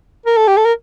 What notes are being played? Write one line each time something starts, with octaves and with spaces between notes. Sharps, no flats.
A#4
A4
G4
A4
A#4